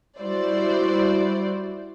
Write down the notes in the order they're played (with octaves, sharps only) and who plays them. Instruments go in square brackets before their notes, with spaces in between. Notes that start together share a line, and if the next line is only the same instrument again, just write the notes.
[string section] G3 E4 F#4 C5 D5